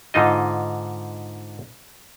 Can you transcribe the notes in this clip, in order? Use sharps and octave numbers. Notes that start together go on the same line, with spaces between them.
G#2 D3 D#4 F4 D#5